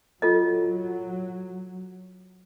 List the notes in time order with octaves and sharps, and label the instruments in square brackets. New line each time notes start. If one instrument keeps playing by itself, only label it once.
[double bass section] F#3 [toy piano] F4 A4 D#5